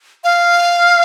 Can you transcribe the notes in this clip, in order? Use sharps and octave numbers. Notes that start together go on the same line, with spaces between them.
F5